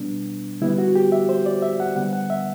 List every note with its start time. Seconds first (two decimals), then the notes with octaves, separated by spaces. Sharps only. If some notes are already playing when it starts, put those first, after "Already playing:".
Already playing: B2 G3 B3 D4
0.62 D3 G3 B3 E4
0.78 F#4
0.95 G4
1.12 E5
1.29 C5
1.46 D5
1.62 E5
1.80 F#5
1.96 D3 G3 B3 F#5
2.13 F#5
2.30 E5